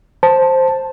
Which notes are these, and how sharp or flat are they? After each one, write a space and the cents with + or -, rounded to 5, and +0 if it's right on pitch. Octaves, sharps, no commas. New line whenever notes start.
C5 +5 A5 +0